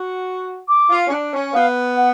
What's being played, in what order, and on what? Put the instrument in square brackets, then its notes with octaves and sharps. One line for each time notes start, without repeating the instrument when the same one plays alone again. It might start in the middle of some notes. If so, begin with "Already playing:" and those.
Already playing: [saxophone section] F#4
[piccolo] D6
[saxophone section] F4
C#4
D4
C#4
[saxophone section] B3 [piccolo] F5
[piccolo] F#5